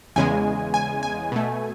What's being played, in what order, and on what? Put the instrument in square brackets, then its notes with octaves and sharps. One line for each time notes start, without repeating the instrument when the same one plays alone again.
[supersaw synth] E2 C#3 G#3 G#5
G#5
G#5
B2 A3